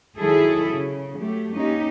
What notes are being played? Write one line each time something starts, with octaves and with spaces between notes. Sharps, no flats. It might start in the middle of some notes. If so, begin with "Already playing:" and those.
D#3 F#3 E4 G#4 A4
C#3
F#3 A3 G4
A#3 C#4 D#4 G4